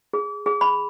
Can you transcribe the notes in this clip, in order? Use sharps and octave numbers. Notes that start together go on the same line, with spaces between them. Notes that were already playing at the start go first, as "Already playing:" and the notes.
G#4
G#4
B5